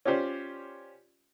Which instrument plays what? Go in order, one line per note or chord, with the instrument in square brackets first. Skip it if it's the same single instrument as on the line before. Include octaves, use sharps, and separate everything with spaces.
[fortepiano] C#4 F4 G4 C5 D5